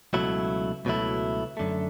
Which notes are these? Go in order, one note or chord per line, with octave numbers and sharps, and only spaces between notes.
C#2 B2 F#3 A3 E4
C#2 B2 F#3 A3 E4
F#2 D3 A3